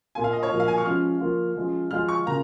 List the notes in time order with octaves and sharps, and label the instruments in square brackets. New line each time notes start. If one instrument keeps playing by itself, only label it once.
[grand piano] A#2 A#3 F4 [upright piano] G#5
[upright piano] F5
D#5
C#5
[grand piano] A#2 F3 A#3
[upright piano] F5
G#5
C#6
[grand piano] F3 G#3 C#4 F4 [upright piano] F6
[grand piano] F3 A#3 F4
F3 G#3 C#4 F4
[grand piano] F3 G#3 F4 [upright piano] F6
[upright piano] C#6
[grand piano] C#3 A#3 F4 [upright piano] A#5